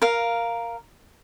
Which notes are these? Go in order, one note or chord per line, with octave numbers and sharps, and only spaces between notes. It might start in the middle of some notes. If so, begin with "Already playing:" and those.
A#4 F5